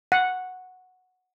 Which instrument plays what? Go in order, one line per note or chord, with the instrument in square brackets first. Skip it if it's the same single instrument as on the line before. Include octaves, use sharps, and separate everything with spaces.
[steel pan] F#5